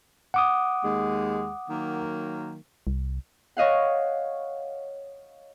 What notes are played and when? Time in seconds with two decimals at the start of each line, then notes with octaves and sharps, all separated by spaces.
0.34 F#5 D6 D#6
0.84 D#2 G#3
1.69 D#3 F#3 A#3
2.87 C2
3.57 C#5 D#5 F5 F#5